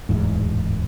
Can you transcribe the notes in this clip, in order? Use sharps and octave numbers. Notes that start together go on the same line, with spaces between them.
D1 E2 G#2